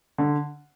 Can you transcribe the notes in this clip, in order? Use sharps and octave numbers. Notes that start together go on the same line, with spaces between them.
D3